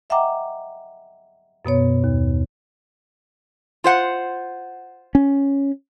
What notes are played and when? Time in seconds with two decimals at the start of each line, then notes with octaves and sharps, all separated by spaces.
0.10 D#5 E5 F#5 G5 A#5 D6
1.65 F#2 B2 B3 C#5
2.04 D#2
3.84 F4 C5 F#5
5.15 C#4